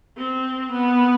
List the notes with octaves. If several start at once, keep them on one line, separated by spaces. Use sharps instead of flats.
C4
B3